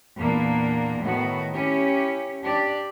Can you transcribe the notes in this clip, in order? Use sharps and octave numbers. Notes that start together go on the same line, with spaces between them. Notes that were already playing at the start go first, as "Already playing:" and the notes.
E2 A#2 A#3 D4
A2 D#3 B3 F#4
C#4 E4 G4
D4 G4 D5